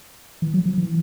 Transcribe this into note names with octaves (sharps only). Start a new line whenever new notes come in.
E3
F#3
F3
E3